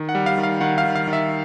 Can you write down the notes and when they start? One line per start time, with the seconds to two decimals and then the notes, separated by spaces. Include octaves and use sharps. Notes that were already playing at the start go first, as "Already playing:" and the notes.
Already playing: D#3
0.09 F#5
0.15 G3
0.26 F5
0.38 D#3
0.43 F5
0.61 D#3 F#5
0.78 F5
0.84 D#3
0.95 F5
1.08 D#3
1.13 E5